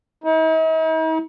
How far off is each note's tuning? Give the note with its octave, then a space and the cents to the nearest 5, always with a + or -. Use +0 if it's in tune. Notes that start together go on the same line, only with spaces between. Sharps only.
D#4 +45